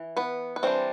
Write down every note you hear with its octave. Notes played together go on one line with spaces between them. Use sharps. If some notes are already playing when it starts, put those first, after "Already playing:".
Already playing: E3
B3 B4
B4
E3 G3 C4 D4 C5